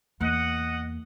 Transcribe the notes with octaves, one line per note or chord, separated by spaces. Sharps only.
E2 A#3 D#5 F#5